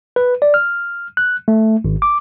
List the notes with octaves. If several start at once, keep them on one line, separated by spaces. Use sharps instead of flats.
B4
D5
F6
F#6
A3
G#1
D6